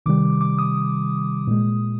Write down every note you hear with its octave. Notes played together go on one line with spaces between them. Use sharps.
C3 D#3 G3 D6
D6
D#6
A#2 G#3